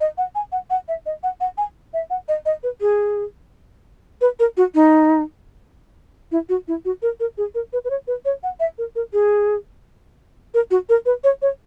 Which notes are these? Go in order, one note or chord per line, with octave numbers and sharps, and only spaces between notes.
D#5
F#5
G#5
F#5
F#5
E5
D#5
F#5
F#5
G#5
E5
F#5
D#5
D#5
B4
G#4
B4
A#4
F#4
D#4
E4
F#4
E4
F#4
A#4
A#4
G#4
A#4
B4
B4
C#5
B4
C#5
F#5
E5
A#4
A#4
G#4
A#4
F#4
A#4
B4
C#5
C#5